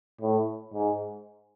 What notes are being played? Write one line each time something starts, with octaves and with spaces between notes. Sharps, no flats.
A2
G#2